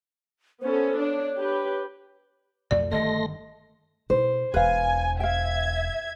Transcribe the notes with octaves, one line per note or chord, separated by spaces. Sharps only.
B3 C#4 A4 C5
D4 C#5
G4 B4
B1 F2 A3 D5
G1 D3 D#3 A3 D#5 C6 A#6
B2 E4 C5
E1 E2 B4 F5 G#5
E5 F5 G5 G#6